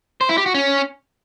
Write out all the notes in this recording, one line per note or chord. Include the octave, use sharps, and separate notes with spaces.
C5
E4
G4
F#4
C#4